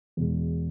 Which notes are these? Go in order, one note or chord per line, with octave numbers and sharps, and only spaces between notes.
E2 B2 G#3